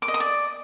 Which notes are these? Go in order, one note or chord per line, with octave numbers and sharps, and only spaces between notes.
D6
D#5
D#6
D5